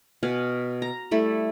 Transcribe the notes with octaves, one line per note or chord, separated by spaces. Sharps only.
B2 F5 F#5 G#5
A#5
G3 A3 E4